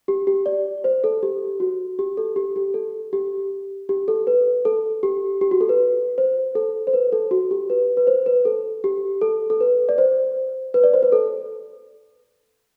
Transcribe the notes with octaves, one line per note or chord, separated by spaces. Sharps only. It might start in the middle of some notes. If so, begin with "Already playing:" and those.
G4
G4
D5
C5
A4
G4
F#4
G4
A4
G4
G4
A4
G4
G4
A4
B4
A4
G4
G4
F#4
A4
B4
C5
A4
C5
B4
A4
F#4
G4
B4
B4
C5
B4
A4
G4
A4
A4
B4
D5
C5
B4
D5
C5
B4
A4